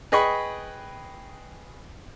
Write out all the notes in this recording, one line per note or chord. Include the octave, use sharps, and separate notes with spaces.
G#4 B4 D#5 G5 B5 C#6